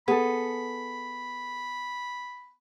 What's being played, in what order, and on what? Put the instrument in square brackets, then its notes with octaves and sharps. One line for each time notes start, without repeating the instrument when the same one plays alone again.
[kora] B3 [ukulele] G#4 A4 [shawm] B5